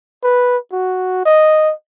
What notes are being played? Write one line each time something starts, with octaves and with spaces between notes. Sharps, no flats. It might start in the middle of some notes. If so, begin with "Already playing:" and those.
B4
F#4
D#5